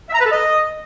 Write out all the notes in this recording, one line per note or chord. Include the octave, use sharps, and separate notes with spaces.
E5
A#5
B4
A4
D#5